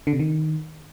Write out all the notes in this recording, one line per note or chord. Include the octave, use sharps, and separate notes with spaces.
D3
C3
D#3